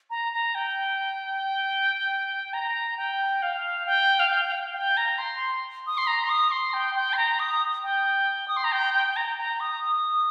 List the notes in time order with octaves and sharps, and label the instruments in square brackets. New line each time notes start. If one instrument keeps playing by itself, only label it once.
[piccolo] A#5
A#5
G5
A#5
G5
F5
G5
F5
G5
G5
F5
G5
A#5
C6
D#6
C6
A#5
C6
D#6
C6
G5
G5
C6
A#5
D#6
G5
D#6
C6
A#5
G5
G5
G5
A#5
A#5
D#6